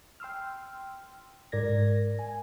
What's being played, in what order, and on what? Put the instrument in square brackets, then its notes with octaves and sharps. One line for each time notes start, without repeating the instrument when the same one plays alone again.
[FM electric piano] G5 C6 E6 F6
G#2 A#4 D5 G#6 A#6
G#5